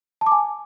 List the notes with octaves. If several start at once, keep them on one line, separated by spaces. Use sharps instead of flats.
A5
D6
G#5